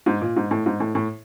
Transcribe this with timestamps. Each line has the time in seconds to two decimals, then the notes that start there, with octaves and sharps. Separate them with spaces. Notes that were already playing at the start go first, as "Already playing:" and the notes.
0.06 G#2
0.21 A#2
0.36 G#2
0.51 A2
0.66 G#2
0.80 A2
0.95 A2